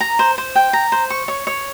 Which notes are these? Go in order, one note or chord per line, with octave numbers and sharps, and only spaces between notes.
A#5
C5
C5
G5
A#5
C5
C#6
C#5
C#5